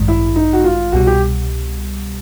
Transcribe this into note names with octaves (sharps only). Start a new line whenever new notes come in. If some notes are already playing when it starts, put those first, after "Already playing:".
Already playing: A1 G2 D#3 G#3
E4
D#4
F#4
F4
C2 B2 G3 F#4
G4